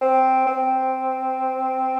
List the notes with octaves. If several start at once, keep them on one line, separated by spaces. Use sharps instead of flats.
C4
C4